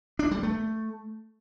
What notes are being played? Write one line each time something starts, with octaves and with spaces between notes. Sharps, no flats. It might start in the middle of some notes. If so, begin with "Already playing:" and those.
D4
G3
A3